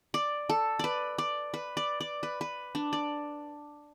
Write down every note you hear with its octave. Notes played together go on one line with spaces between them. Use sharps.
D5
A4
B4 D5
D5
B4
D5
D5
B4
B4
D4
D5